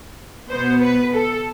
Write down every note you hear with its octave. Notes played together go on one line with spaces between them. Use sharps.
B2 B3 C5
B4
A4